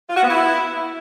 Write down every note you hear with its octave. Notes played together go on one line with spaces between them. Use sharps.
F4
F#4
B3
E4